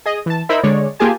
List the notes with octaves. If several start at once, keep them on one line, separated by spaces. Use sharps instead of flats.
G#4 D#5
E3 A5
D#4 E4 A#4 C5 E5 B5
D3 G#3 C#5 D5
A#3 F4 G4 G#4 G#5 A5